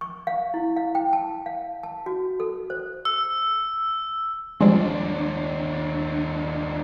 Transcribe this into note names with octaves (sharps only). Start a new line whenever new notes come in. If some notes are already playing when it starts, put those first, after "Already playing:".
C#6
F5
E4
F5
G5
A5
F5
A5
F#4
A4
C5
E6
D#2 F3 G3 G#3 D4